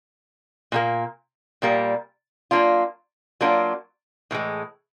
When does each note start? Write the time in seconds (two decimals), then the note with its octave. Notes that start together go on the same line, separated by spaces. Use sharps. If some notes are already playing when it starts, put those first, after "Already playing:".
0.72 A#2 G3 A#3
1.62 A#2 G3 A#3
2.51 F#3 A#3 D4 F4
3.41 F#3 A#3 D4 F4
4.31 A2 E3 G#3